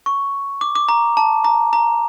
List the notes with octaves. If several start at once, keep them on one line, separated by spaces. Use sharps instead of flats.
C#6
D6
D6
A#5
A5
A#5
A#5